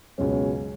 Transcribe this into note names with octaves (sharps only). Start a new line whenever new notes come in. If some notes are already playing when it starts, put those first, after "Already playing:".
C#2 B2 F#3 C#4